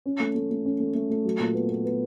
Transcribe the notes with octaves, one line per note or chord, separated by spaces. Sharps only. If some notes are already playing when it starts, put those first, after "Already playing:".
C#4
A3
A3
A3
C#4
A3
A3
A3
F#3
A#2
B3
B3
B3